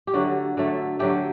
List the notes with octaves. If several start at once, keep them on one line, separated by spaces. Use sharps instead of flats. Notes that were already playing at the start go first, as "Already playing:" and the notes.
G4
D3 F#3 A3 F#4
D3 F#3 A3
D3 F#3 A3 G4